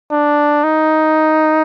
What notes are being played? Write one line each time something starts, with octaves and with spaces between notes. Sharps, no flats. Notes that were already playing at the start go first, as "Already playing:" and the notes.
D4
D#4